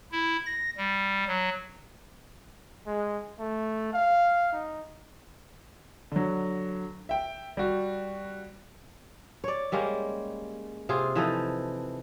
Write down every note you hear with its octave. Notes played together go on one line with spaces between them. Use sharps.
E4
A#6
G3
F#3
G#3
A3
F5
D#4
D3 F#3
E5 G5
G3 F#4
C#5 D5
G3 G#3 A#3 C#4
C3 F4 G#4
E3 F3 D#4 A4